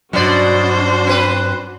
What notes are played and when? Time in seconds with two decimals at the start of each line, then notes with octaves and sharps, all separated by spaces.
0.13 G2 B2 F#3 C#4 D4 F#4 C5 D5
1.07 C4 B4